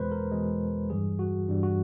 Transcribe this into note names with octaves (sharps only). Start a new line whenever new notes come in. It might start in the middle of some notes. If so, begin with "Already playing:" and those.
Already playing: E2 B2 G#3 B4 C5
A#4
E2 B2 G#3
G2 E3 G3 G#4
F#4
G2 E3 G3
F#4